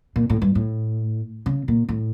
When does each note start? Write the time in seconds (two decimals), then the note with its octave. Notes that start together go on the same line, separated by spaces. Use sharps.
0.16 A#2
0.30 A2
0.42 G2
0.55 A2
1.46 C#3
1.68 A#2
1.89 A2